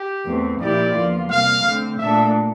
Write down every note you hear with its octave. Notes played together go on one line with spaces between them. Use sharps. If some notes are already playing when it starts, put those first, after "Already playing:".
Already playing: G4
E2 E3 A3 C4
A#2 F3 A#3 E4 G4 D5
E2 D3 F3 A#3 F4
C3 G3 A#3 F5
D3 A3 C4
A#2 A3 D4 A4 E5